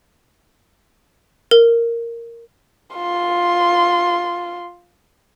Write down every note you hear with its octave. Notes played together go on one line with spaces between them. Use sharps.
A#4
F4 C6